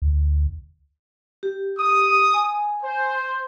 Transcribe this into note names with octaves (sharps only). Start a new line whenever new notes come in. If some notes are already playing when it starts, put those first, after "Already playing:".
D2
G4
D#6
G#5
C5